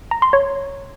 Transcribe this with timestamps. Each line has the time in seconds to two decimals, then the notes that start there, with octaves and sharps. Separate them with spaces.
0.11 A#5
0.22 C6
0.33 C#5